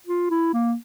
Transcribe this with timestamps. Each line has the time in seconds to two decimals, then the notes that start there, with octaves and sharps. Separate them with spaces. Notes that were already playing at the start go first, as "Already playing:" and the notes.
0.07 F4
0.30 E4
0.54 A#3